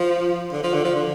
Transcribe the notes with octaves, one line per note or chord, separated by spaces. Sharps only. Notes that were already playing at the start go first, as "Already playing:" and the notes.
Already playing: F3
D3
F3
D3
F3
D3